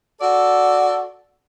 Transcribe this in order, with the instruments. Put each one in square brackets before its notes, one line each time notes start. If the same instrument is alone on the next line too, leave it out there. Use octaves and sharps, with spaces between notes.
[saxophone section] F#4 A4 D5